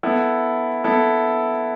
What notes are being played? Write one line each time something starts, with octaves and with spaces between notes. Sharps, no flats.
B3 E4 A4
B3 E4 A4